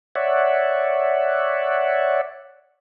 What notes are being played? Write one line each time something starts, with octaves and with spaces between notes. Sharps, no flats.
C#5 D5 E5 F#5